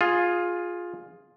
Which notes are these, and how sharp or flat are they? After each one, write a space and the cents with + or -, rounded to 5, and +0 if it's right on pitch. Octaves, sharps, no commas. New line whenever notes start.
F4 +10 G#4 +0